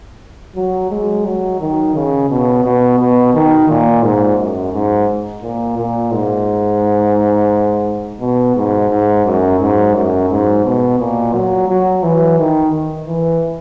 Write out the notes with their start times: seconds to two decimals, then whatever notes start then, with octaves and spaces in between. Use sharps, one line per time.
0.56 F#3
0.91 G#3
1.25 F#3
1.60 D#3
1.95 C#3
2.30 B2
2.64 B2
2.99 B2
3.34 D#3
3.69 A#2
4.03 G#2
4.38 F#2
4.73 G#2
5.43 A#2
5.78 A#2
6.12 G#2
8.20 B2
8.56 G#2
8.90 G#2
9.25 F#2
9.60 G#2
9.94 F#2
10.30 G#2
10.65 B2
10.99 A#2
11.34 F#3
11.69 F#3
12.03 E3
12.38 D#3
13.08 E3